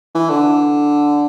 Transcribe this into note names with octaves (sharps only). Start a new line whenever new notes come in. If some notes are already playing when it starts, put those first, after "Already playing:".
E3
D3